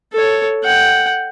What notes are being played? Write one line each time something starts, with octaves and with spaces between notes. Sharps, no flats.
A4 C#5
F#5 G5